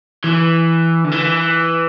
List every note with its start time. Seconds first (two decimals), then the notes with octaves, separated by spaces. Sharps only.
0.24 E3
1.04 D3
1.12 E3